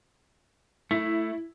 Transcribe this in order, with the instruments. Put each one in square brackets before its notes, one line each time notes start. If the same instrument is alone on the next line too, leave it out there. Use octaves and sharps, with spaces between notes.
[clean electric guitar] A3 [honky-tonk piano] E4